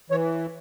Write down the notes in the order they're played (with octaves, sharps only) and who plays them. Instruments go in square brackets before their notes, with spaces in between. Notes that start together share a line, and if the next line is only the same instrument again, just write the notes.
[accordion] E3 C#5